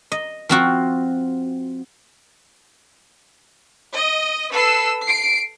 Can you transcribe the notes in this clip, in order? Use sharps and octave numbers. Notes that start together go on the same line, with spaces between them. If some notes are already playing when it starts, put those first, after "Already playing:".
D#5
F3 C4 F#4
D#5
A4 B4 E6 C7
C7 D7